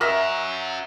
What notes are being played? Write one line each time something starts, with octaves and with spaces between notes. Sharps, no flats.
C#4 F#4 A#4 D#5 E5